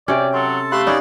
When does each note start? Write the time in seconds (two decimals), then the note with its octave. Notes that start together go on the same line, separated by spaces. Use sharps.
0.08 C3 C#4 C#5 D5 G5
0.34 F#3 A4 C6
0.72 A3 G4 F5 B5 C6 F#6
0.87 B3 C#4 D#4 D5